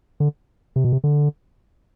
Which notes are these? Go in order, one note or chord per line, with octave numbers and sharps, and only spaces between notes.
D3
C3
B2
C3
D3